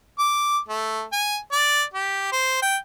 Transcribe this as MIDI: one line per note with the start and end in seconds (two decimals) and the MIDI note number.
0.19 0.59 86
0.68 1.03 57
1.13 1.37 80
1.52 1.83 74
1.94 2.27 67
2.32 2.61 72
2.62 2.77 79